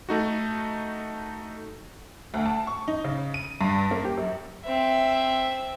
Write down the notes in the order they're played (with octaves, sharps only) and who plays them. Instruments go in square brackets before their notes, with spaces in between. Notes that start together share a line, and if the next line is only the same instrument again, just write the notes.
[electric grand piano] A3 D#4 F#4
[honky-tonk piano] D2
A5
C#6
D#4
C#3
D#7
G2
A#3
G4
F#2
[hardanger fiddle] C4 E5